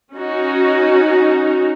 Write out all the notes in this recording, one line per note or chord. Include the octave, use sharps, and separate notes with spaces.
C#4 D#4 F#4